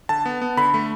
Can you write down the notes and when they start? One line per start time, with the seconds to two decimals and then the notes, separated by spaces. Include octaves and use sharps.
0.09 D3 A5
0.26 B3
0.41 B3
0.57 D3 B5
0.74 A3